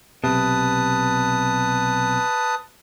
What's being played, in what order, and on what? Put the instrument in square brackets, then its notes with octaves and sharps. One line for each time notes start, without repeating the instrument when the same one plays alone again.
[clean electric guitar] B1 C3 [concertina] B4 A5 D#6